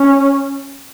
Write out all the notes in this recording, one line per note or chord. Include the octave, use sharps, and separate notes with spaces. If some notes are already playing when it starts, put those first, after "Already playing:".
Already playing: C#4